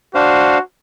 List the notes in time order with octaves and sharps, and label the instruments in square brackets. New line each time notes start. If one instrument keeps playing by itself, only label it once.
[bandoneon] D4 C5 F5 [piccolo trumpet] F#4